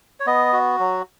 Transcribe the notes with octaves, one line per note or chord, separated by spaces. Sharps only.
C#5
B3 D#5
F#4
F#3